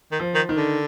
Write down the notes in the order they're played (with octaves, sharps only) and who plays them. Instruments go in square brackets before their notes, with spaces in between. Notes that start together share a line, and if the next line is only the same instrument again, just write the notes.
[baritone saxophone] D#3
[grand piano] F3
[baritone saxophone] D#3
[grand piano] D#3
[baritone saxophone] D3